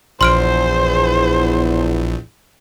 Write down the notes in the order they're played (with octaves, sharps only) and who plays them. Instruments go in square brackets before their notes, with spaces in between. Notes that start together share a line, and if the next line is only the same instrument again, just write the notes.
[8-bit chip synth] A#1 [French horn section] E2 [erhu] C5 [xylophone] C6 F6 D7